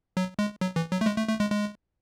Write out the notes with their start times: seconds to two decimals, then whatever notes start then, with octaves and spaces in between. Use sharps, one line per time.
0.17 F#3
0.39 G#3
0.61 F#3
0.76 E3
0.92 F#3
1.01 A3
1.06 G#3
1.17 A3
1.29 A3
1.40 G#3
1.52 G#3